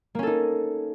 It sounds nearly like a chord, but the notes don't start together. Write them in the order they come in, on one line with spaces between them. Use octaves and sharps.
A#3 C#4 A4 D#4